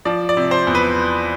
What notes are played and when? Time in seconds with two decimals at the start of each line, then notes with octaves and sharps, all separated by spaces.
0.05 F3 D5
0.29 D5
0.37 C3
0.51 C5
0.67 E2
0.75 B4